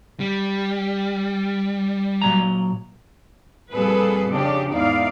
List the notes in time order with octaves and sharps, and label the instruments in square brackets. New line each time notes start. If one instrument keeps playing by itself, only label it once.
[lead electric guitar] G3
[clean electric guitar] A#2 F#3 A#5
[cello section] F2 A#2 G3 G#4 A4 B4
C#3 F3 C#4 D4 G4
E2 G#2 D#4 E4 D5 F5